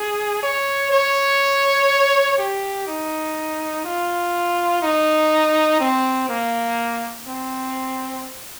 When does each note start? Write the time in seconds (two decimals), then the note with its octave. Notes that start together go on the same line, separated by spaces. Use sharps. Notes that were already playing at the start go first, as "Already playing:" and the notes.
Already playing: G#4
0.43 C#5
0.92 C#5
2.38 G4
2.87 D#4
3.85 F4
4.83 D#4
5.81 C4
6.29 A#3
7.27 C4